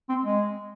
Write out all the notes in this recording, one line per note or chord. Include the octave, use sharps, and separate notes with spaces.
C4
G#3